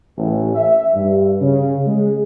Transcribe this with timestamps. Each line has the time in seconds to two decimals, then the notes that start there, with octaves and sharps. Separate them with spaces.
0.17 A1
0.55 E5
0.94 G2
1.41 C#3
1.87 G#3